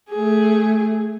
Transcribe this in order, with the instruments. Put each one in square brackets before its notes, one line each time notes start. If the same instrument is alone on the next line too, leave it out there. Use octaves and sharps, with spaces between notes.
[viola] A3 G#4